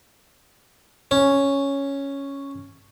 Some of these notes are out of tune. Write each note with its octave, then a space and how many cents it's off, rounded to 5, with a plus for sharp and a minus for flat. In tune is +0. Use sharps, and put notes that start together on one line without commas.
C#4 +0